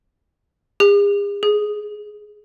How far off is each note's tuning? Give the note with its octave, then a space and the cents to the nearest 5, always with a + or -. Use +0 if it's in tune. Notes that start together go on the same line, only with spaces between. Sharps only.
G#4 -45
G#4 +10